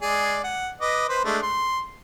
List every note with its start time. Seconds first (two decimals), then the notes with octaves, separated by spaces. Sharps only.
0.02 G#3 G#4 D5
0.44 F#5
0.81 B4 D#5 D6
1.09 B4 C5
1.25 G#3 A3 D4
1.42 C6